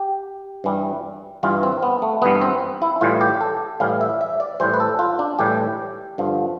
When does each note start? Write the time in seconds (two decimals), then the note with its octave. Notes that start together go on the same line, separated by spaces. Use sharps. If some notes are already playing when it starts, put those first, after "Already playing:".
Already playing: G4
0.64 G2 E3 G3
1.43 G2 E3 G3 F4
1.63 C4
1.83 B3
2.02 A3
2.22 G2 E3 G3 B3
2.41 C4
2.82 E4
3.01 A2 E3 G3 F4
3.21 G4
3.41 A4
3.80 A2 E3 G3 F5
4.01 E5
4.21 E5
4.40 D5
4.60 A2 E3 G3 C5
4.74 B4
4.80 A4
4.99 F4
5.19 D4
5.39 A2 E3 G3 G4
6.18 G2 D3 F3